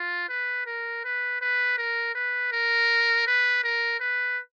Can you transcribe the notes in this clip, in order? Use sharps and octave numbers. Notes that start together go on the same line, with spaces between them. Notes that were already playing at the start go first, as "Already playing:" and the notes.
Already playing: F4
B4
A#4
B4
B4
A#4
B4
A#4
B4
A#4
B4